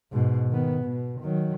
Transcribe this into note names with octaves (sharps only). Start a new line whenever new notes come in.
G#2 B2
D#3 B3
B2
D#3 F#3